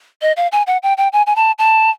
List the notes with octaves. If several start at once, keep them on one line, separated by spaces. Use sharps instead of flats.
D#5
F5
G#5
F#5
G5
G5
G#5
G#5
A5
A5